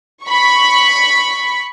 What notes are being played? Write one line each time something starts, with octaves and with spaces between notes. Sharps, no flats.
B5 C#6